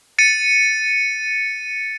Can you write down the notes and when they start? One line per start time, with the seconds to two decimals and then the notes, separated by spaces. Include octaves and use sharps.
0.18 A6 C#7 D#7